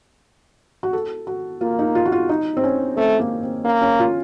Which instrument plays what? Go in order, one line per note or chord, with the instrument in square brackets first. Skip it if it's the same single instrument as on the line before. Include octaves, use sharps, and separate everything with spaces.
[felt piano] F#4
A4
F#4
[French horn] A#3 [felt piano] F4
[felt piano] D#4
F4
F#4
F4
D#4
C4
C#4
[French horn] A3 [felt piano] C4
[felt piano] A#3
C4
[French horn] A#3 [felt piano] C#4
[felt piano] C#4
F4